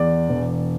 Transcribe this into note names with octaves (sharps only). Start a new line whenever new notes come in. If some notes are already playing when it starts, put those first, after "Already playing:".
Already playing: E2 D5
E1